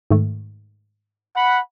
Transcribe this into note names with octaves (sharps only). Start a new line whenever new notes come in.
G#2 D#3 A3
F#5 B5